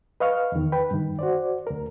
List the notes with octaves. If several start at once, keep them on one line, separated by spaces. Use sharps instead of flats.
B4 D#5 F5 C#6 F6
E2 D#3
B4 G5 B5
G2 D#3
F#4 C5 D5
D2 A#4